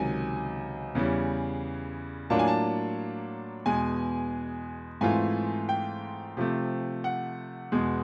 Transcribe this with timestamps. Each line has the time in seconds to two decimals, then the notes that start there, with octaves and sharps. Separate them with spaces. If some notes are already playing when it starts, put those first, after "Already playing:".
Already playing: C#2 C3 D#3 F#3 G#5
0.95 E2 C#3 E3 G3
2.30 A2 F#3 A#3 D4 F4 A5
2.39 G#5
2.48 A5
3.66 E2 B2 G#3 G#5
5.01 G#2 E3 A3 C4 F4 G#5
5.69 G5
6.37 C3 F3 A3
7.04 F#5
7.72 E2 B2 G#3